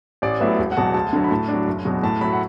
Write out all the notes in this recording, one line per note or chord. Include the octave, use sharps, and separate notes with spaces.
A1 D5
A2 F#3 B3 E5
E1
F#5
E2 B2 F#3 A5
D2 A5
D3 F#3
B5
A2 A5
F#3 D4
F#1
E2 B2 F#3
A2 A5
F#3 A3 B5
F#5